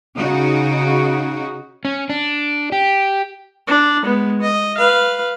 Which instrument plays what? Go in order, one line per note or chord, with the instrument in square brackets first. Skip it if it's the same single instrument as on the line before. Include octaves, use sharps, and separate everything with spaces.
[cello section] C#3 D#4 F#4
[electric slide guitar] C#4
D4
G4
[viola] D4
G#3 B3
D#5
B4 F5